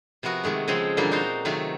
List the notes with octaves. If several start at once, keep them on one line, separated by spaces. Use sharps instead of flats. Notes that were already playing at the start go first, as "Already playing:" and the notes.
C3 F3 B3 F#4 A#4
C3 D#3 G#3 A3
C#3 F3 G#3 C4 F4
A#2 D3 E3 G3 A#3 F4
D#4 F#4 A#4 C5 F5
C3 D#3 F#3 A3 F4